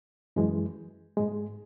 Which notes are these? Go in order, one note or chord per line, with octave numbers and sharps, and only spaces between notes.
F#2 E3 G#3
G#2 G#3